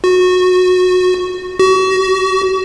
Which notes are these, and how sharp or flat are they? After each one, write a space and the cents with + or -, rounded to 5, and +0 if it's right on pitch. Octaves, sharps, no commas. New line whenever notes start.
F#4 -20
F#4 +35